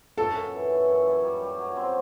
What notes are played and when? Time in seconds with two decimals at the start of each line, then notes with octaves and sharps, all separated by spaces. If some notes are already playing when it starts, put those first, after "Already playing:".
0.17 F#2 A4
0.36 F#2
0.53 E3
0.70 F#2
0.88 F#2
1.07 F#2
1.24 G3
1.41 G3
1.59 F#3
1.76 C4